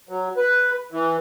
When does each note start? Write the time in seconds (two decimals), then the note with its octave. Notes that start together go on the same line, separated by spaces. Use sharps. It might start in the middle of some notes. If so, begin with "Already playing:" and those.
0.09 F#3
0.37 B4
0.92 E3